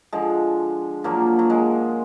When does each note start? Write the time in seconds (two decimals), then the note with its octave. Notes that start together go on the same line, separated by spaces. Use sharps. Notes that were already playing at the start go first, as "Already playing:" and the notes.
0.13 D3 F3 G#3
1.04 A#2 F3 F#3 A#3
1.39 F#3
1.50 G#3